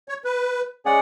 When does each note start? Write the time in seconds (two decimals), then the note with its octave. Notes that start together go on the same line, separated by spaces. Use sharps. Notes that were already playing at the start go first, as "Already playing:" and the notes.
0.09 C#5
0.24 B4
0.85 G#3 C#4 G#4 D5 F#5